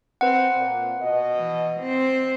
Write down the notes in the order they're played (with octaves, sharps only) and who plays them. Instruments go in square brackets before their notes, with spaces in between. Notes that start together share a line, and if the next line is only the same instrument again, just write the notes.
[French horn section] C4 [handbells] B4 F#5
[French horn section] A#2
B2 D#5
[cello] E3
C4